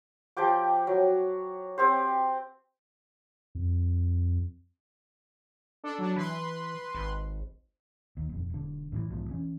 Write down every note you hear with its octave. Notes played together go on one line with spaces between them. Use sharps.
F3 G4 G5 D6
F#3
C4 G4 C5
F2
D4 A4
F#3 D4
E3 B4 C6
G#1
D#2
D#1 F2
E1 D3
E2 A2 C#3 E3
B1 E2 G#2 F3
E3 C#4